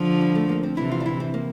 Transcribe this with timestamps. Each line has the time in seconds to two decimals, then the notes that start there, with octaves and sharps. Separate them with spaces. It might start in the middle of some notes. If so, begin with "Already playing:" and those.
Already playing: D3 F3
0.21 G3
0.35 A3
0.49 A#3
0.63 C4
0.77 C3 E3 E4
0.91 F4
1.00 D4
1.06 E4
1.20 C4
1.34 A#3